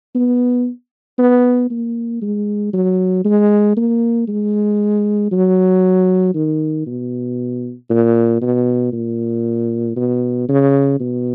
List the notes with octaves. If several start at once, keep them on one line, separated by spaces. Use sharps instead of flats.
B3
B3
A#3
G#3
F#3
G#3
A#3
G#3
F#3
D#3
B2
A#2
B2
A#2
B2
C#3
B2